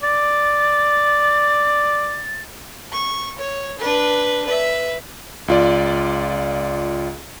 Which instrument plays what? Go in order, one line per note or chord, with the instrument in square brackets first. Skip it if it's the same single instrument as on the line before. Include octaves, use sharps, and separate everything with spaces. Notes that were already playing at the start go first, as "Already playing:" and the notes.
[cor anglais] D5 [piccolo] A6
[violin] C#6
C#5
D4 B4
B4 E5
[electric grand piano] C#2 F4 D5